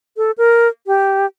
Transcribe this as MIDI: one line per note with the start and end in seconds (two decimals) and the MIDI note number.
0.17 0.31 69
0.38 0.68 70
0.87 1.26 67